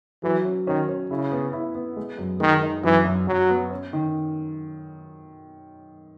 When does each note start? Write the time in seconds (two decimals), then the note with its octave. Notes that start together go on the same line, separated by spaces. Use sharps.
0.23 E3 F#3
0.45 C#4
0.67 D#3 C#4
0.88 C#4
1.10 C#3 E4
1.32 B3
1.53 E4
1.75 B3
1.97 G#3
2.18 F#2
2.40 D#3 G#3
2.63 D#4
2.83 F#2 E3
3.05 F#2
3.27 F#2 F#3
3.49 B3
3.70 C#4
3.93 D#3